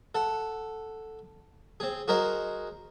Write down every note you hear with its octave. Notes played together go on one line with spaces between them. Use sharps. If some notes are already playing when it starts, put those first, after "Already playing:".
A4 F#5
C4 G#4
F#4 G#4 A#4 C5 D#5